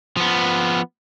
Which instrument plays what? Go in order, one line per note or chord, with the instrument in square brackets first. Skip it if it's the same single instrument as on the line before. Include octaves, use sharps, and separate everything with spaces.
[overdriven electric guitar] F3 B3